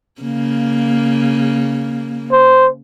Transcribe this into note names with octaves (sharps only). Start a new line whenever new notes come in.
C#3 A#3
C5